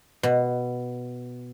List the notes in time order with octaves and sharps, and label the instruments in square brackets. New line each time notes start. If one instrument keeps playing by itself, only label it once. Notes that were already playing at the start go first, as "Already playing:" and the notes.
[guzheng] B2